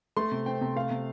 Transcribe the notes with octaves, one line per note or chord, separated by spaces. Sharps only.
A3 C6
C3
C4 G5
C3
A3 F5
C3